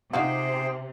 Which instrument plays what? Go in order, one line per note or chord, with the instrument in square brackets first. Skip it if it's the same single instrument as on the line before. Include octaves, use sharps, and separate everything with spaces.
[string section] C3 [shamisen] D#4 F4 F#4 [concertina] G#4 C5 G5